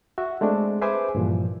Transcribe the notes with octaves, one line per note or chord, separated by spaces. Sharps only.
F#4 E5
G#3 A3 C4 D4
G#4 B4 C5 E5 G#5 D6
G2 A#2 E3 F3